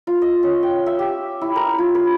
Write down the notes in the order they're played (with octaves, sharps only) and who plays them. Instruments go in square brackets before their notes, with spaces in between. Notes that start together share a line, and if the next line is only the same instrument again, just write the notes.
[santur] F4
D#5
C#4
G5
E5
G4
E4
A#4
F4
B4